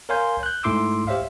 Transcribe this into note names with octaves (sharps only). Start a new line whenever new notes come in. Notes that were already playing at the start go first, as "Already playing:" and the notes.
A#4 C#5 F5 G#5 C6 G6
F#6 G6
G#2 A3 E4 C6 D6 E6
G4 C5 C#5 E5 F5